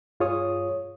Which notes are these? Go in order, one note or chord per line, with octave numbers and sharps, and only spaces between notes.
G2 F4 G#4 C#5 D#6